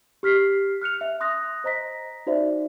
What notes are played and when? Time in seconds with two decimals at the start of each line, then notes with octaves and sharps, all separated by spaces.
0.23 G4 F6 B6 C7
0.82 F6 F#6 C#7 F7
1.01 E5
1.20 C6 D#6 F#6 A#6
1.64 C5 D#5 A#5 A#6 B6
2.27 D#4 F#4 C5 D5 E5